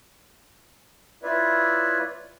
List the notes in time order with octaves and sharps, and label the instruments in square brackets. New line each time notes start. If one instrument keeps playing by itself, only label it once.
[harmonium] E4 F4 B4 C#5 D5 E5